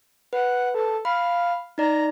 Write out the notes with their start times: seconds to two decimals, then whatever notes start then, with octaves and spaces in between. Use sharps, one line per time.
0.33 B4 F#5
0.74 A4
1.05 F5 B5
1.78 D#4 D5 A#5